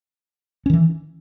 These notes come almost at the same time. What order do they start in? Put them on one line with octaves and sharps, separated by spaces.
C#4 D#3 E3